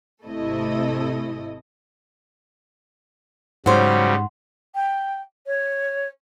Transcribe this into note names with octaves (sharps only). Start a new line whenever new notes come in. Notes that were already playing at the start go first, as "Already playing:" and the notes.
G#1 C3 A3 E4 A4 D#5
G#2 C#3 F#3 G3 C5 F#5 C6
G5
C#5